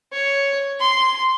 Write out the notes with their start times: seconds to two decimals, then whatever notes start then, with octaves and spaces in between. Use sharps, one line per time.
0.12 C#5
0.80 C6